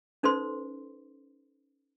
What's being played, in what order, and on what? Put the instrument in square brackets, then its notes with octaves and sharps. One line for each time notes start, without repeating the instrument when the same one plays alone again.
[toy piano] C#4 D#4 A4 B4 C5 C6